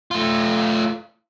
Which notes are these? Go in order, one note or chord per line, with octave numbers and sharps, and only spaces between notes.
A3 F4